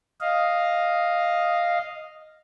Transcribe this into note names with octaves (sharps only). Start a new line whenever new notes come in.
D#5 F5